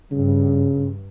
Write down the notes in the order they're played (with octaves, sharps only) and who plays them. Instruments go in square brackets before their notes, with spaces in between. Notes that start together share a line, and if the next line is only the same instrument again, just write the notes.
[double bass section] G2 [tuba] C#3